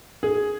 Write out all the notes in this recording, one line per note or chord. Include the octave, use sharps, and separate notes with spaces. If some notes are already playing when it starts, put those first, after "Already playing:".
G#4